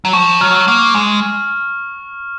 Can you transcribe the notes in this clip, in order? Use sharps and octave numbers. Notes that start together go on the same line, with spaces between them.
F#3
F3 C#6
F#3 F6
A#3 F6
G#3 C#6